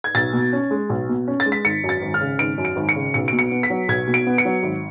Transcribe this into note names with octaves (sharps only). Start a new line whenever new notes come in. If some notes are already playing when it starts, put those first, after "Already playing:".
G#6
B1 A6
B2
C#4
G#3
B1
B2
C#4
A6
G#3
B6
G#1 C#7
F#2
A6
G#1
F6
C#3
G#1 D7
F#2
D7
G#1
C#7
C#3
B1 C#7
B2 D7
C#7
B3
B6
F#3
B1 G#6
B2
D7
B3
C#7
F#3
G#1